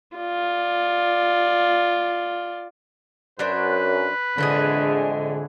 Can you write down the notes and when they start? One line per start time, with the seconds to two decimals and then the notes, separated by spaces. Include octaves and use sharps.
0.16 F4 D5
3.39 F#2 F#3 D4 B4 C5
4.38 F2 A2 D3 E3 G#3 G#4